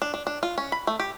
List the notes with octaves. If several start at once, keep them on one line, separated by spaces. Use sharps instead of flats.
D4
D4
D4
F4
C#4
B5
A3
G4